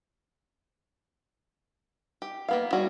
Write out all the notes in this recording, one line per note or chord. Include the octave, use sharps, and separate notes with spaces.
G4
A#3 B3 F5
G3 F#4 G#4 C#5